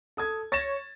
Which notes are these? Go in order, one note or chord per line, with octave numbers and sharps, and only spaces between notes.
A4 D#6 G#6
C#5 A6 A#6 E7